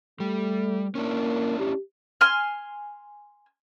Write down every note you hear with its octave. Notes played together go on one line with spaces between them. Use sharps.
G3 A3
A#3 C#4 D4 E4
G4
G#5 C6 F6